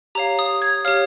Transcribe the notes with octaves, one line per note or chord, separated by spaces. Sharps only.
G4 C#5 F5 A#5
D#6
G#6
G4 C#5 F5 F6